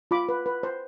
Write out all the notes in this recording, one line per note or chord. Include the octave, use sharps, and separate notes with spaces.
F4 B5 D6
B4
B4
C5